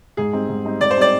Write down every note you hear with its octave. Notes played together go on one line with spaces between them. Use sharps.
G#2 G#4
G3 C4 D#4
G#2
G3 C4 D#4
G#2 D5
C5
G3 C4 D#4 D5